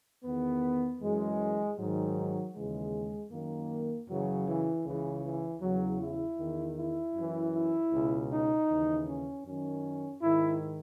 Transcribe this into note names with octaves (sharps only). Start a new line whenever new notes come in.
E2 D#3 B3
F#2 E3 G#3
G#2 D#3 F#3
D#2 C#3 E3 G#3
F#2 D#3 A#3
F#2 C#3 E3 F#3
E3
C#2 C#3 E3
E3
E2 C#3 E3 F#3
E4
E2 D#3
E4
F#2 E3
E4
C#2 B2
D#4
D#2 C#3 E3
C#4
F#2 D#3 C#4
G#2 D#3 E4